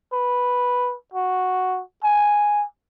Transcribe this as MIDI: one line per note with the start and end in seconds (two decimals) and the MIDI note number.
0.13 0.95 71
1.14 1.81 66
2.04 2.65 80